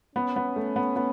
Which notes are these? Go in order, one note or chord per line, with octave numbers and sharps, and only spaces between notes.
B3 C#4
B3
A3
B3
B3